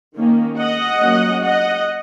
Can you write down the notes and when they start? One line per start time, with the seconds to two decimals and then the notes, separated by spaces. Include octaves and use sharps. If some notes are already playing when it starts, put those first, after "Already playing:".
0.16 D#3 A#3 C#4
0.58 D#5 F#5
1.01 F#3 A#3 C#4
1.43 D#5 F#5